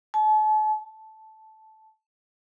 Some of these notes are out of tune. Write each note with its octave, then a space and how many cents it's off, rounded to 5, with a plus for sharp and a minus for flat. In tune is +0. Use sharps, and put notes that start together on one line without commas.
A5 -40
A5 -10